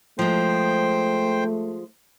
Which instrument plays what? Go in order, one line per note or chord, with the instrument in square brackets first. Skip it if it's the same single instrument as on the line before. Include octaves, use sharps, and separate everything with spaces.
[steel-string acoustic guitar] F3 G#3 [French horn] A3 [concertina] C5 G5